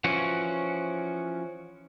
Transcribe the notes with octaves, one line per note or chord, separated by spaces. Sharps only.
E3 F3 C#4 F#4